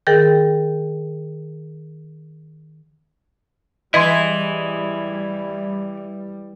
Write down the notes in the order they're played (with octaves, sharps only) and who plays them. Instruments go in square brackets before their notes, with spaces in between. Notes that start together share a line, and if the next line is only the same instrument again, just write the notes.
[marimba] D#3 G#4 A#4 G5 A6
[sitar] E3 [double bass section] G3 [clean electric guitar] E4 G#4 [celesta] D#5 C6